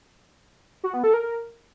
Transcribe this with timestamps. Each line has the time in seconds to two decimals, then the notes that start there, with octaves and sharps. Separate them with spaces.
0.84 F#4
0.94 B3
1.04 A4
1.14 A#4